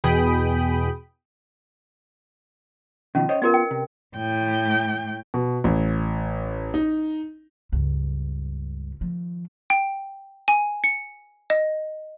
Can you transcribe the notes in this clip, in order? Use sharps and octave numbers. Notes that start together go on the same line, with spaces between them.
E2 B2 G#4 G5 B5 D#6
B2 D#3 F3 C#4
C5 C#5 D#5
B3 F4 A#4 B4 D5
G5
C3
A2 G5
B2
A1
D#4
C#2 G2
D#3 F3
G5
G#5
C#7
D#5